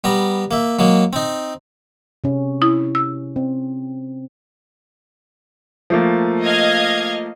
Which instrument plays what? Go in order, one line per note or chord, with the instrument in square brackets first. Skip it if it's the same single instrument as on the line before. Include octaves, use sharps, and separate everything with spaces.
[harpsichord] G3 B3 A#5
A#3 E5
F#3 G#3 A#3
C4 D#4
[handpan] C3 C#4
[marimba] E4 D#6
E6
[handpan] C4
[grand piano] F3 A3 A#3
[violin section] D#5 F5 G#6